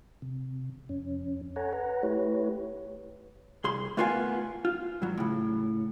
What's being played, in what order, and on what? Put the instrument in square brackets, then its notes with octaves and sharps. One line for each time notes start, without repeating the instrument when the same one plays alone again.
[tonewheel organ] C3
F2 C#4
A4 C#5 F#5 G#5 A#5
B4 F#5 A#5
A3 E4 G4 B4 C#5
[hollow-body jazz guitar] C2 G#4 C6
A3 B3 F4 A#4 F5 G#5
F4
G2 F#3
A2 C#3